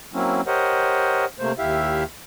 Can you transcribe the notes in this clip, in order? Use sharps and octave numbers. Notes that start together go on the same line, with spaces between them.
F#3 A#3 C4 C#4 E4
G4 A#4 C5 C#5 D#5 F#5
C3 A3 A#3 C5
D#2 E4 G4 E5 F5